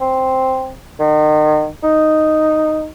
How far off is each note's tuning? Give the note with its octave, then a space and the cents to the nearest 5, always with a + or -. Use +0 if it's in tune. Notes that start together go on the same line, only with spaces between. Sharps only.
C4 +0
D#3 -35
D#4 -5